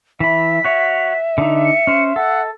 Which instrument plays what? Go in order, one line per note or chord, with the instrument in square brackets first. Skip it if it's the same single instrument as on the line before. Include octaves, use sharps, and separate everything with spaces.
[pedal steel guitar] E3 B5 [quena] E5 [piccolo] B6
[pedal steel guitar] F#4 C#5 [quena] E5
[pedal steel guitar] D3 D#4
[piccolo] C#7
[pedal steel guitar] C#4 C5
[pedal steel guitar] A4 [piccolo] F#5